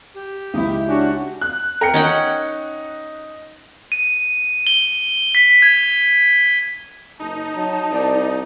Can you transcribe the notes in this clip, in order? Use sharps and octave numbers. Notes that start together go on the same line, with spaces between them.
G4
C#2 D#4 E4
C#4 D4 F#4
F#6
A#4 G5 C#7
C#4 D#4 F#5 G5
D#7
G7
B6
G#6
F#1 D#4 A5
F#3
C2 D5